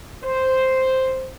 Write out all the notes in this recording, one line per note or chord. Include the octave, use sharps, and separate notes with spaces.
C5